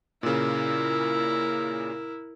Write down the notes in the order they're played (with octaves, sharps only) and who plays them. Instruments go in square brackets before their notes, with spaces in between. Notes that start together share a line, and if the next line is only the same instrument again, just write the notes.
[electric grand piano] A#2 C#3 [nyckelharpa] E4 A#4